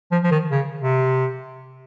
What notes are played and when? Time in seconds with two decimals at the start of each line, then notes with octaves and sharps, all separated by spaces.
0.11 F3
0.23 F3
0.31 D#3
0.51 C#3
0.81 C3